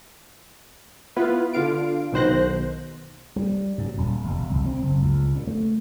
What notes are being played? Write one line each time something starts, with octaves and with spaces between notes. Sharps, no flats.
B3 E4 F4 B4
D3 F4 F5 D7
B1 B2 D#3 C5 F#6 A#6
G3
F#2
D#1
E1
C2
C4
F#1
C#2
A#2
A3